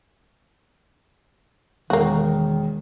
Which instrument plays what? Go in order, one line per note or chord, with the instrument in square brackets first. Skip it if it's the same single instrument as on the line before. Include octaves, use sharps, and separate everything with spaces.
[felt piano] E1 [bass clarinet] D#3 [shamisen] A#3 F#4